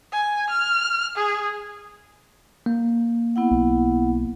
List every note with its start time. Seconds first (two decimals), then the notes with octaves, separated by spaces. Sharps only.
0.12 G#5
0.50 F6
1.16 G#4
2.66 A#3
3.36 B3 E4 F#5
3.51 B1